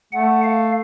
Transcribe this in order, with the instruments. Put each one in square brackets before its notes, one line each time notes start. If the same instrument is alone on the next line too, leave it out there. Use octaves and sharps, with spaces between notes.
[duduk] A3 [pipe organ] F#5
[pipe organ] F5